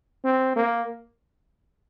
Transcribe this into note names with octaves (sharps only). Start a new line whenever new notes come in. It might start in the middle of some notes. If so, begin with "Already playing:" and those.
C4
A#3